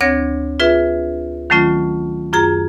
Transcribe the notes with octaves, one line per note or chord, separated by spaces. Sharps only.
D2 C4 D4 C#5 G#6 A#6
F4 G#4 B4 E5
D#3 F#3 A3 C#4 F4
F#2 F4 G#4 A#5